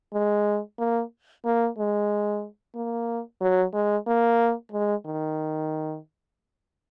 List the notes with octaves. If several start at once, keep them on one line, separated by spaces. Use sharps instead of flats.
G#3
A#3
A#3
G#3
A#3
F#3
G#3
A#3
G#3
D#3